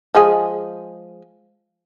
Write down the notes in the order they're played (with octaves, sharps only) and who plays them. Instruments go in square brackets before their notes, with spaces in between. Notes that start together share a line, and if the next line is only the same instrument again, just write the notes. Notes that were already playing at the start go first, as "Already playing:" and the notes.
[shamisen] F3 G#3 G#4